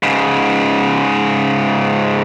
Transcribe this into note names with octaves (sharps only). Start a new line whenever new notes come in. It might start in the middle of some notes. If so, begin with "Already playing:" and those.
G#2 C#3